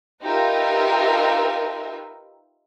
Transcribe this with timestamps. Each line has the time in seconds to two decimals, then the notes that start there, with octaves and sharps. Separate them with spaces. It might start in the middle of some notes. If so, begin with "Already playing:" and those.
0.24 D#4 F4 G4 A#4 B4 E5